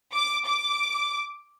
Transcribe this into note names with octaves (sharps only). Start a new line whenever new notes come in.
D6
D6